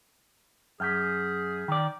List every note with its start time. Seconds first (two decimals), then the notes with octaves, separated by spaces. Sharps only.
0.80 F#2 G#4 F6 G6 B6
1.68 D#3 D5